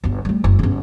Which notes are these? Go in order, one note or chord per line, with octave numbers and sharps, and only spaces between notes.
G1 F4
G3 A3
F#1
G1 C#3